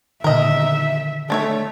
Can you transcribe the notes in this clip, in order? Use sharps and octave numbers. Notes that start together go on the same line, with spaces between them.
A#2 D3 D#3 A#4 D#5 E5
A3 D4 C#5 E5